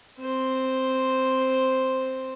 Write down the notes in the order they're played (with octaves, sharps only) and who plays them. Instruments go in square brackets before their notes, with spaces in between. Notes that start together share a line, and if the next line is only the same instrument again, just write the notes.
[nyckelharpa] C4 C5